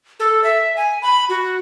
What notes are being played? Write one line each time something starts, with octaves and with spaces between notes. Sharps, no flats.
A4
E5
G#5
B5
F#4